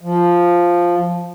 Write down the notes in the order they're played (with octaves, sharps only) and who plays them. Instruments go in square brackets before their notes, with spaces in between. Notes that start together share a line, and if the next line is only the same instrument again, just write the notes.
[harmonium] F3